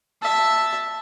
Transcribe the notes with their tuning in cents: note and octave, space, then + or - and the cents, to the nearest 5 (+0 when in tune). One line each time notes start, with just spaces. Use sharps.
E5 +0 A5 +0